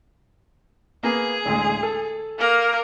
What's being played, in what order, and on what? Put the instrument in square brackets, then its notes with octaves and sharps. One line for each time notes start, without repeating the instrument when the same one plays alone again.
[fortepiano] A#3 B3 [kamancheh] G#4
[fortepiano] A1 D2 G#3
A4
[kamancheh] A#3 A#4